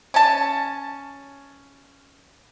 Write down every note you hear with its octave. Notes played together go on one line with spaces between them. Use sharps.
C#4 A5